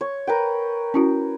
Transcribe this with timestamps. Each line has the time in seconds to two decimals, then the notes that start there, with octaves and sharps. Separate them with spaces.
0.01 C#5
0.27 A#4 B4 G5
0.94 C#4 E4 F#4